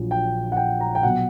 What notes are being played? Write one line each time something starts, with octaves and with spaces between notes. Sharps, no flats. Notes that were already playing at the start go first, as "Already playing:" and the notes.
Already playing: A#1 A#2 F#3
G5
F#5
G5
A#5
G5
B2 F#3 F#5